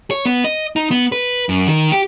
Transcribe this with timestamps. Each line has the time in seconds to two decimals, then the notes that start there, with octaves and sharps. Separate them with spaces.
0.11 C#5
0.26 B3
0.44 D#5
0.76 D#4
0.91 B3
1.12 B4
1.49 F#2
1.68 D#3
1.92 G4